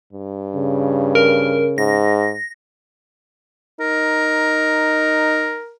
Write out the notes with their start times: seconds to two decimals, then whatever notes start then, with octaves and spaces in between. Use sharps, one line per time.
0.13 G2
0.56 C#3
1.15 A#4
1.78 G#2 A#6
3.80 D#4 A#4